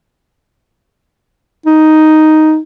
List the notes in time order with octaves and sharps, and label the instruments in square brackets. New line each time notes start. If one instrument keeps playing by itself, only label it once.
[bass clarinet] D#4